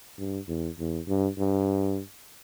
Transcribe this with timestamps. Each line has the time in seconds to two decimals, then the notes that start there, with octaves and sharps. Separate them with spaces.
0.18 G2
0.48 E2
0.79 E2
1.08 G2
1.38 G2